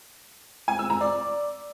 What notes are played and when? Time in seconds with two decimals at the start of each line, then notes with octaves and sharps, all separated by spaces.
0.68 G#5
0.79 E6
0.90 A#5
1.01 D5